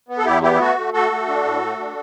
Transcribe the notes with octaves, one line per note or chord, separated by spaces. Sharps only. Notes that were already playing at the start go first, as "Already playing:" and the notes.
B3
A4
E2 E4 G4
B3 E4 G4
E4
A3 F#4
A3
A3 F#4 A4
A3
D4
A2
A3
D4